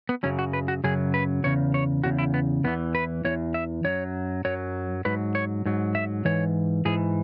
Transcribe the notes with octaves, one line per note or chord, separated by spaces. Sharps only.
B3
F#2 C#3 F#3 C#4
F#4
B4
F#4
F#2 C#3 F#3 G#4
B4
E2 C#3 C#5
C#5
E2 C#3 F#4
E4
B3
E2 E3 B3
B4
E2 E3 C#5
E5
F#2 F#3 C#5
F#2 F#3 C#5
G#2 F#3 B4
C#5
G#2 F#3
E5
G#2 E3 C#5
G#2 E3 G#4